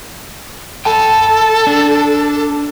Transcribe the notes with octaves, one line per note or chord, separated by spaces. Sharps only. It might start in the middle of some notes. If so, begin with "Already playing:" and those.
A4 G5 A5
D4